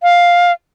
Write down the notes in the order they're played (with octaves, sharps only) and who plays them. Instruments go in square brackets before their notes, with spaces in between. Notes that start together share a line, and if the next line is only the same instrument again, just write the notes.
[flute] F5